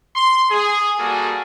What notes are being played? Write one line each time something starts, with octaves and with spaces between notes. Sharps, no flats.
C6
G#4
G3 A#3 F#4 G#4 A4